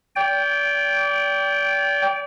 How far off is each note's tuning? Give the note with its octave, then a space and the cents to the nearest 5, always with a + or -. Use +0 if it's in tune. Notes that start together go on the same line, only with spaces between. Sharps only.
D5 -35 G5 +0